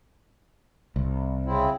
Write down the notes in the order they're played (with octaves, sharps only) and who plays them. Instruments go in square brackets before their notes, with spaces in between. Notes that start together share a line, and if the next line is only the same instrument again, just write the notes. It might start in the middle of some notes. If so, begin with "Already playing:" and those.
[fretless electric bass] C2
[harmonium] C#3 C4 E4